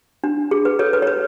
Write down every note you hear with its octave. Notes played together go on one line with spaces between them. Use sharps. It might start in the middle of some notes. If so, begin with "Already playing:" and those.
D4
G#4
B4
A4 C#5
B4
C#5
B4